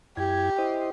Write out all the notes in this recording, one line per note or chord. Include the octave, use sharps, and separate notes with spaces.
F#2 E4 G4 G#6
E4 C5 D#5